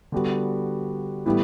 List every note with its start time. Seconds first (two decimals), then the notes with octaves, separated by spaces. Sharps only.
0.12 D3 G3 B3 F#4
1.25 A2 E3 G3 B3 E4